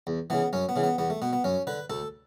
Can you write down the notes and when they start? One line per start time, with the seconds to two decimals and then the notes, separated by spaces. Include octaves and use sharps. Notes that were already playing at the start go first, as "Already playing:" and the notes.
0.07 E2
0.30 C#3 E3 B3
0.53 F#2 C#4
0.69 B3
0.76 C#3 E3
0.83 B3
0.98 E2 B3
1.10 A3
1.22 B2 B3
1.33 B3
1.44 F#2 C#4
1.67 D3 B4
1.90 D2 A4